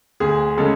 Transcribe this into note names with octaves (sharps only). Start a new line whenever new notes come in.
D2 G#4
C#3 G#3 A4